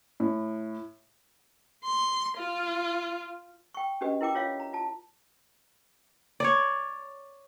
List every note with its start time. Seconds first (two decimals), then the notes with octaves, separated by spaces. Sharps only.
0.20 A2
1.84 C6
2.38 F4
3.74 G5 C#6
4.01 C#4 D4 F#4 G4 B4 D#5
4.21 E4 A#4 G5 D6
4.35 F4 C#5 E5 F5
4.60 A#5
4.73 F4 A5
6.40 C#5 D5